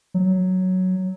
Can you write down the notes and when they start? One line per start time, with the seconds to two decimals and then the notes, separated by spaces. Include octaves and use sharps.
0.14 F#3